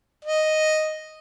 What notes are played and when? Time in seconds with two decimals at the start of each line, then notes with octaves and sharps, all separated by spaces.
0.25 D#5